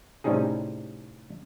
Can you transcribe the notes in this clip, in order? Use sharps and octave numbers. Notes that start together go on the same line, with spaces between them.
A2 C3 G3 C#4 D#4 G#4